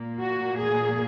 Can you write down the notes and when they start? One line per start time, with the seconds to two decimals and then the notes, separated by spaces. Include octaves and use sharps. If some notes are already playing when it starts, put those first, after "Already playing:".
Already playing: A#2 A#3
0.19 F#4
0.58 G#4